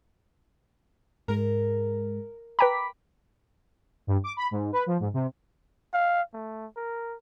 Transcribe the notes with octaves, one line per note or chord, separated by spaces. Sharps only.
G#2 G#3 A#4
B4 G5 A#5 B5 D6 B6
G2
D6
B5
G#2
B4
F3
G#2
C3
F5
A3
A#4